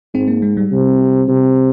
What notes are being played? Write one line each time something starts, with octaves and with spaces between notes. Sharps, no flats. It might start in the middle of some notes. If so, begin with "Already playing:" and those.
G#2 C4
A#3
G#3
G3
C3
C3